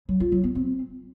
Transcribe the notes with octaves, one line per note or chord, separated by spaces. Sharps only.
F#3
F4
F#3
B3
C4